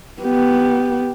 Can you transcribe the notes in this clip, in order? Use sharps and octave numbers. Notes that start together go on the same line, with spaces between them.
B3 G4